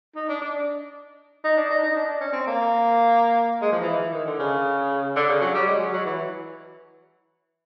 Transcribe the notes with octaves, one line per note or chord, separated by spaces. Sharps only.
D#4
D4
D4
D#4
D4
D#4
D#4
D4
D4
C#4
C4
A#3
G#3
F3
E3
E3
D#3
D3
C#3
D3
C#3
F#3
G3
G#3
F#3
F#3
E3